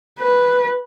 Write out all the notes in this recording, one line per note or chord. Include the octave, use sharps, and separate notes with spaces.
B4